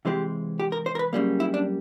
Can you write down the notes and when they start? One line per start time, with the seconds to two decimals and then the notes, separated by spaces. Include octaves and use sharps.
0.05 C3 E3 G#3 C4 G4
0.60 G4
0.72 A#4
0.86 C5
0.95 A#4
0.99 B4
1.13 F#2 C#3 E3 G3 A#3
1.40 E4
1.54 D4